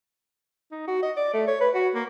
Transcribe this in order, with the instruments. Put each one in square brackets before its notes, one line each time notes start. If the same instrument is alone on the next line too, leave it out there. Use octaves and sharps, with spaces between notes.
[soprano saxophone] D#4
F#4
D#5
D5
A3
C#5
B4
F#4
A#3